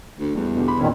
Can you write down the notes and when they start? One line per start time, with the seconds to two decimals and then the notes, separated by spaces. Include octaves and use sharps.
0.19 D2
0.35 E2 G3 A3
0.56 B2 D3 G4
0.68 B5 C6 D6
0.79 A#2 D#3 A#3 C#4 E4